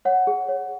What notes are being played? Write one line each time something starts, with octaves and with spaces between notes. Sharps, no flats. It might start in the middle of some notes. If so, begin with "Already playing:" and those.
C#5 F#5
G#4
C#5